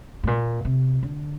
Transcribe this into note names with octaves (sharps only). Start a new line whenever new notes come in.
G#2
A#2
C3
D3